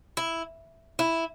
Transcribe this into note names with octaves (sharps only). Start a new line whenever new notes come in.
E4
E4